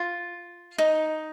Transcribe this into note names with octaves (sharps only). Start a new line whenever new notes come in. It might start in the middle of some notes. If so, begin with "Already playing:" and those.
Already playing: F4
D#4